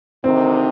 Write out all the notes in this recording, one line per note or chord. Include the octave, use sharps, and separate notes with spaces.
D2 C3 D#3 C4